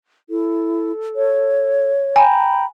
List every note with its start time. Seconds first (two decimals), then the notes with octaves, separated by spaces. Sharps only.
0.29 E4 A4
1.16 C#5
2.16 G5 G#5 A#5 B5